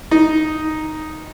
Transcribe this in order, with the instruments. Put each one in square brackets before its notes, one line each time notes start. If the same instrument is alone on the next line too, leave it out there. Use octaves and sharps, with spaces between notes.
[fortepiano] D#4